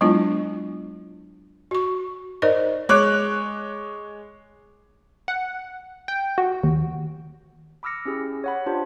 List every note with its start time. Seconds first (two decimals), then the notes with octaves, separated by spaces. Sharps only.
0.01 F#3 G#3 B3 D4 E4 F4
1.71 F#4 C#6
2.42 D#4 A#4 C5 D5 D#5
2.89 G#3 C#5 D6 F#6
5.28 F#5
6.08 G5
6.38 F#4
6.63 D#2
7.83 B5 D6 E6 F6 A#6 C#7
8.05 C#4 E4 G4 G#4
8.44 C#5 F#5 B5
8.66 D4 F4 G4 C5